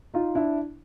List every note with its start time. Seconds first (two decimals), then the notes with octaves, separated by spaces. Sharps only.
0.14 D#4 F4
0.35 D4 E4